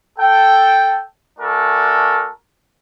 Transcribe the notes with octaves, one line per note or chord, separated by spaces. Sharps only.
A4 G5
A3 D4 F#4 A4 A#4 G#5